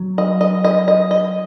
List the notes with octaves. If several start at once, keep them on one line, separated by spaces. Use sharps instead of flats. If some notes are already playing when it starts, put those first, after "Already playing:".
Already playing: F#3
D#5
D#5
D#5
D#5
D#5